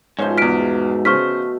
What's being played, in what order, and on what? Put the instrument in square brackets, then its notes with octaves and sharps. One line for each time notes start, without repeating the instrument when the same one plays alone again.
[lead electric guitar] G#2 [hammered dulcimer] B2 F3 A3 [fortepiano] C#4 C5
[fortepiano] E2 F6 [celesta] B6 D7
[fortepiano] C#3 C5 [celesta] C#6 F6 B6